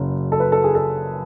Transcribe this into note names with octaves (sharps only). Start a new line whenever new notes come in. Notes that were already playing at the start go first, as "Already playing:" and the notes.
Already playing: F#1 F#2 C#3
A4
B4
A4
G#4
A4